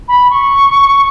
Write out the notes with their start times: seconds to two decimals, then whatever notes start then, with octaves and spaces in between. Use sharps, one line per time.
0.08 B5
0.30 C#6